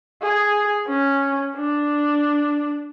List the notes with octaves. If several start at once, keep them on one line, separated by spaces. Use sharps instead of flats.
G#4
C#4
D4